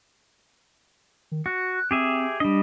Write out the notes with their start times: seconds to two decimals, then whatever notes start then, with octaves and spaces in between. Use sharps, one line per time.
1.32 D#3
1.46 F#4 F#6
1.91 C4 G4 G#4 E5
2.40 G3 D4 D#5